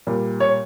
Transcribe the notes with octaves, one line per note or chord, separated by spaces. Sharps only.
A#2 G3
C#5